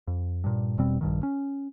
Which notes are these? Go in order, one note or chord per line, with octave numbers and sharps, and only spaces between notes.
F2
G2 A#2
E1 B2 G3 C4
A#1 G2 D#3
C#4